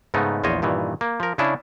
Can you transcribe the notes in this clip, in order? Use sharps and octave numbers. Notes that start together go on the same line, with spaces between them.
G#2 C#3 A3 B3 D#4
A#1 E2 F4 C5 C#5 D#5
G2 A#2 D#3 E3
A#3
F3 A#4
C#3 C#4 D4 E4 G#4